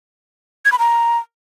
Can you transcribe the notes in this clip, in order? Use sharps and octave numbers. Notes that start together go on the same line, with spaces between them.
G#6
B5
A#5